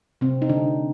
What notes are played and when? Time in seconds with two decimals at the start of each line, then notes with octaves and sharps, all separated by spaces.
0.21 C3 C4
0.42 D#4
0.49 D3 D4